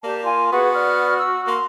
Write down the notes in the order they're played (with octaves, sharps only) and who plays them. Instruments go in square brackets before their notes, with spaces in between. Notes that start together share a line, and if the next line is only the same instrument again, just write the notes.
[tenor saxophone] A#3 [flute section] G4 D5 A5
[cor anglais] F4 [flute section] G#5
[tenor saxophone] B3 [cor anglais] F#4 [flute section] G#4 B4 F#5
[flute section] D5 F6
E6
[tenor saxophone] A#3 [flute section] C6